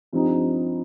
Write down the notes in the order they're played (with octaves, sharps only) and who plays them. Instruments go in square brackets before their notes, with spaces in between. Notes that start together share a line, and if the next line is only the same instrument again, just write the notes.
[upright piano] G2 F3 C4 D#4